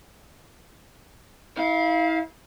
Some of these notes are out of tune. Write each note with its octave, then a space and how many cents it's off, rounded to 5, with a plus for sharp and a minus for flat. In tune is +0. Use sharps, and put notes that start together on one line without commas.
E4 -35 F5 +0